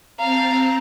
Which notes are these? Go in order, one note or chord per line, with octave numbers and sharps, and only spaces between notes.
C4 F5 A5 A#5